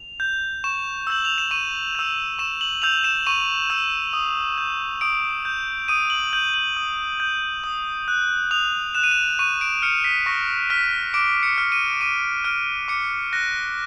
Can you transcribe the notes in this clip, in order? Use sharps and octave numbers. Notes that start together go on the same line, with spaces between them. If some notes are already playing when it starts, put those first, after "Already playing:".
Already playing: F7
G6
C#6 E7
E6 G6 F#7
F7
E7
C#6 D#7
E6 G6
C#6 E7
F#7
E6 G6 F7
E7
C#6 D#7
E6 G6
D#6
G6
D#6 D7
G6
D#6 D#7
F#7
G6 F#7
F#7
D#6
G6
D#6
F#6
D#6 F7
F#6 E7
D#7
E7
C#6 D#7
D7
F6 C#7
B6
C#6 A#6
F6 B6
D6 D7
C#7
F6
D#7
D6 D#7
F6 D7
D6 C#7
F#6 A#6